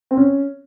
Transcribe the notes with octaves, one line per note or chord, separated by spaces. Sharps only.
C4
C#4